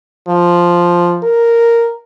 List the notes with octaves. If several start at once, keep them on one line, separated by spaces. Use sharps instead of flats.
F3
A#4